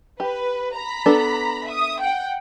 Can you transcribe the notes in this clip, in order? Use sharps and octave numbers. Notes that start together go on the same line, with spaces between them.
G4 B4
A#5 B5 B6
B3 D4 A4
E5 D#6
F#5 G5